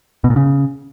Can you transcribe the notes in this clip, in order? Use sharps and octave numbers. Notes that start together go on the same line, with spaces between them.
B2
A#2
C#3